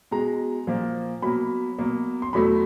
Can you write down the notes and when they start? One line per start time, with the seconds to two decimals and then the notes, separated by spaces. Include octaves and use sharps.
0.11 B2 G#3 A#5
0.67 A#2 F3 A#3
1.22 B2 F#3 A#3 B5
1.78 B2 F#3 A#3
2.22 C6
2.33 E2 B2 F#3 A3 B5